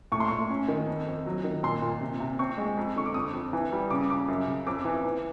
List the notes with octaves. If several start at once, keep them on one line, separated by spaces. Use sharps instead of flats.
A2 C#6
C6
A2 C#6
C#4
D#3
F2
F2
F#3
D#3
A#2 C6
A#2
C3
C3
C4 C#6
G#3
F2
D3 C#6
D6
F2 D#6
F2
E3
G3
C#3 D6
D#6
C#3 D6
F#2
C#3
F2 D6
E3
E3